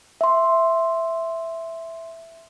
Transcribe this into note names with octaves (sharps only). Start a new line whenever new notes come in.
E5 C6